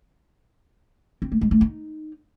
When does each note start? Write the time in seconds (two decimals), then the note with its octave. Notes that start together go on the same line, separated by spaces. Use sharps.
1.22 C4
1.32 A3
1.41 G#3
1.51 A3
1.61 D#4